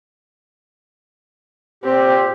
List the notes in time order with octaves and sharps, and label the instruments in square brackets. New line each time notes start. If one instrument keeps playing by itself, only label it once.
[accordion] A#2 G4 [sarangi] C4